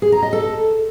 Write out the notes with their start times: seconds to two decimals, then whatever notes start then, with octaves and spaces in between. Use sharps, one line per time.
0.02 G#4
0.12 A#5
0.22 D#5
0.33 A4